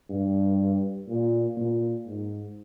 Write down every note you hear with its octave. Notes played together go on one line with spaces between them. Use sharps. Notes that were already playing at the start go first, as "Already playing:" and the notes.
G2
A#2
A#2
G#2